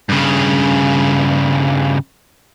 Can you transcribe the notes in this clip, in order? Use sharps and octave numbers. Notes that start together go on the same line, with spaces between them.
G2 C#3